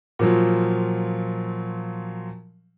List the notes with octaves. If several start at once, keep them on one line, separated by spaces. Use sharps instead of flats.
A#2 F3 F#3